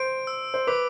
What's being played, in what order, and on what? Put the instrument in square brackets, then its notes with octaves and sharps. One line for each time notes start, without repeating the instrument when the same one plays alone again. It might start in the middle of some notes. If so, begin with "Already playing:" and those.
Already playing: [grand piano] C5 [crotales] D7
[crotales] E6
[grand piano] C5
[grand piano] B4 [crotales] D6